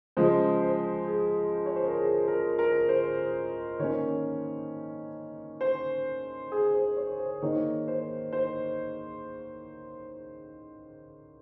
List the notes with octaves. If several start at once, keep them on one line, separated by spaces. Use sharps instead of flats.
C#3 F3 G#3 C5
C5
G#4
C#5
C5
A#4
G#4
A#4
A#4
C5
D#3 A#3 C#4 C#5
C5
G#4
C5
C#5
C5
D#3 A#3 D#4 C#5
C5
C5